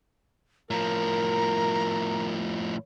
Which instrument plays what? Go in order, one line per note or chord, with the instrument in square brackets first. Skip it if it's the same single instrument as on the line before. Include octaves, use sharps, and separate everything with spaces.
[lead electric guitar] A2 F3 [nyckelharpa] A#4 [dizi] A#5